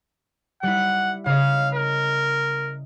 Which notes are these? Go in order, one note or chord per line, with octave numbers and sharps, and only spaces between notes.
G3 E4 F#5
C#3 D#5 F5
A#4